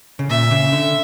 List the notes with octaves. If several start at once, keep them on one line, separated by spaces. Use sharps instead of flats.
C#3
A#2 E5
C#3
D3